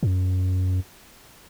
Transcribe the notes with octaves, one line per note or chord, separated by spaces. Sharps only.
G#2
F#2